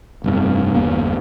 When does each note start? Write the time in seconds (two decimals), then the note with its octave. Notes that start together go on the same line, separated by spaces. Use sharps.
0.24 F1 G2 C3
0.75 G1 E2 A#3